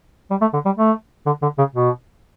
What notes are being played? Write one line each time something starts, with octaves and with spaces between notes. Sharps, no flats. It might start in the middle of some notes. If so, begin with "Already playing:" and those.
G3
A3
D3
G3
A3
D3
D3
C#3
B2